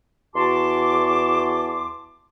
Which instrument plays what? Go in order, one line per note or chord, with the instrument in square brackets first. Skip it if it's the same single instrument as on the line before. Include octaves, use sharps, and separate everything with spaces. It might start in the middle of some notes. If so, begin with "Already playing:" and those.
[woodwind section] E2 F#4 A5 C6 D6